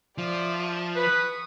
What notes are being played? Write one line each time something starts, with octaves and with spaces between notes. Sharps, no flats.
F3 D5 E5
B4 C#6 D#6